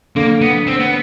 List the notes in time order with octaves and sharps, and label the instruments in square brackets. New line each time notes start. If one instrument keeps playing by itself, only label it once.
[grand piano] D3 [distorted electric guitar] A#3
[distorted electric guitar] B3
C4
B3